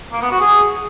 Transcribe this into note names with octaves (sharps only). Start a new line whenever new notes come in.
A#3
B3
F#4
G#4